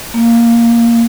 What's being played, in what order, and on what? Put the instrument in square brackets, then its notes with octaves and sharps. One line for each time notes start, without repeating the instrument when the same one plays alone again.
[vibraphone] A#3